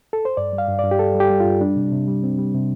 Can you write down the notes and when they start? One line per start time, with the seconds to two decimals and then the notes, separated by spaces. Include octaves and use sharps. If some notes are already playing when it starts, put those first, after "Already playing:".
0.13 A4
0.25 C5
0.37 G2 D5
0.53 G3
0.58 F5
0.68 G2
0.79 G2 D5
0.91 G4
0.99 G3 A4
1.15 G3
1.20 G4
1.30 G3
1.40 F4
1.45 G2
1.61 G3 D4
1.76 C3
1.92 C3
2.08 G3
2.23 C4
2.38 G3
2.54 C3